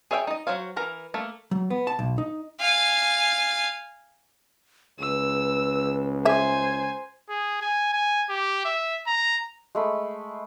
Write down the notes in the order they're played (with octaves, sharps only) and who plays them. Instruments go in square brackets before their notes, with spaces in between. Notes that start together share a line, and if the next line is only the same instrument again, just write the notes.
[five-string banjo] G#4 C#5 E5 F5 G5
D#4 D#5
F#3 C5 C#5 F5
E3 A#4 A#5
A3 A#3
[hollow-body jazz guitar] F#3
B3
A5
B1
D#4
[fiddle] F5 G#5
[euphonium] C#2 [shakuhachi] B4 [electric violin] E6
[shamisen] G#4 E5 [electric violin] C5 G#5
[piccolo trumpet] G#4
G#5
G#5
G4
E5
A#5
[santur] G#3 A3 B5